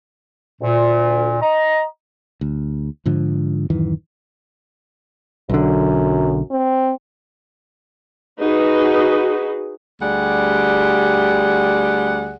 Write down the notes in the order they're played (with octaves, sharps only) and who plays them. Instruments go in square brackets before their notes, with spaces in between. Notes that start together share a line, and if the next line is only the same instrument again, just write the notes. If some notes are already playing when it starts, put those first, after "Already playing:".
[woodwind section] D2 A#2
D#5 A#5
[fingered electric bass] D2
G#2 D3 F3
D1 F#2 D#3 E3
[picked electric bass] B1 D3 [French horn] F#2
[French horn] C4
[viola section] D#4 F#4 G#4 B4
[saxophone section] D2 G3 G4 G#4 D5 F#5